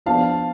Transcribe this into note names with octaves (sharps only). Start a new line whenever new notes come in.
F3 B3 D4 F4 F5 A5